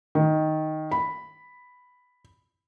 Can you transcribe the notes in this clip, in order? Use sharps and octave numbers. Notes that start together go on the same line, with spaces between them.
D#3
B5